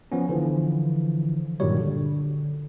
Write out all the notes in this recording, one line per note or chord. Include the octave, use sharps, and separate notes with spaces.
F3 B3 C#4
D3 E3 F3
G2 A#2 D#3 F#3 G3 C#5
D3